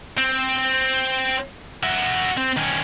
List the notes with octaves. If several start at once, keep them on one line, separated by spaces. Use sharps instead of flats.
C4
F#4 E5
C4
D#3 C#4